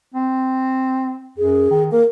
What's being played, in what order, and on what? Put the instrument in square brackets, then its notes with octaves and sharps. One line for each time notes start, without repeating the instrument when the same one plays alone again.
[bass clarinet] C4
[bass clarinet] F#2 [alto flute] G#4
[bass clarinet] D#3
[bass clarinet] A#3 [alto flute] A#4